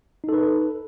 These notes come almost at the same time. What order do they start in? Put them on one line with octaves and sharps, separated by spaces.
D#4 A4 B4